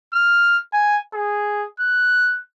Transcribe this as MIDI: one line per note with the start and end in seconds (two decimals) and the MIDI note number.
0.13 0.58 89
0.73 0.99 80
1.14 1.66 68
1.80 2.40 90